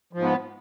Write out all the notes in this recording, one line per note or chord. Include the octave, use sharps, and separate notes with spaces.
G#2 F3 B3